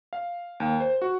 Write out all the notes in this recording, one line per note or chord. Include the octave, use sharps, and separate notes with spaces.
F5
D#2
C5
F#4